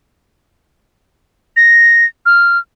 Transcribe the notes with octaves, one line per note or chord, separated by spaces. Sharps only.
A#6
F6